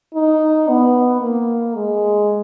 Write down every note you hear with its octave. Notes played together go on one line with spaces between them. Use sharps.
D#4
B3
A#3
G#3